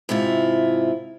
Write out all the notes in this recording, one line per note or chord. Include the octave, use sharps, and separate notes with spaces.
G#2 C3 E4 F4